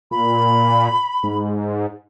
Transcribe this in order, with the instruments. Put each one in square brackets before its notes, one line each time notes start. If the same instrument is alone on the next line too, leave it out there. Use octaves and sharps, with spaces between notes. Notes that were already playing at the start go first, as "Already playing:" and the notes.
[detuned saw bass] A#2 [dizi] B5
[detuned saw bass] G#2